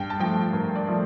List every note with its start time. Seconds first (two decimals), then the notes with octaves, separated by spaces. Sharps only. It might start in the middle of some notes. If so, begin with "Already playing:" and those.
Already playing: G2 G5
0.10 A5
0.20 F3 A3 G5
0.53 G2 A#4
0.75 D5
0.87 F3 A3